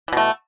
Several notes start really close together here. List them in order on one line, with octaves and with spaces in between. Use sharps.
E3 B2 A3